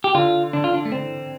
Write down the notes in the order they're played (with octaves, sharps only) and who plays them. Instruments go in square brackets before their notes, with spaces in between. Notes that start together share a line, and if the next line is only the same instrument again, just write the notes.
[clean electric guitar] G4
[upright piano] D3 [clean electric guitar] F4
[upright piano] D3 [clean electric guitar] D4
[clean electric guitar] F4
D4
A3
[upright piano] D3 [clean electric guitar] C4